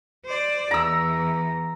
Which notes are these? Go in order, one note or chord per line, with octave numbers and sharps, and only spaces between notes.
C5 D5
E2 A#5 E6